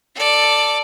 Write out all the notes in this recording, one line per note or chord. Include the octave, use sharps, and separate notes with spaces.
A4 D5